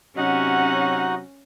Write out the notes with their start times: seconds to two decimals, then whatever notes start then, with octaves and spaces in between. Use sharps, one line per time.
0.17 C3 F#3 C#4 D#4 F#4 D#5 F#5